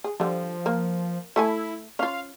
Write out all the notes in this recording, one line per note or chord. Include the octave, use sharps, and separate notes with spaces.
G#4
D3 F3 G3
A#3
A3 E4 A4 G#5
C#4 F4 F5